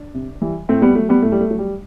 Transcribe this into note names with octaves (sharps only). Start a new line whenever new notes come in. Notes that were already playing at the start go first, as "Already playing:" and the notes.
Already playing: D4
C3
E3 G3
A2 A3 C4
G3 B3
F#3 A3
G3 B3
A2 A3
G3
A3
F#3
G3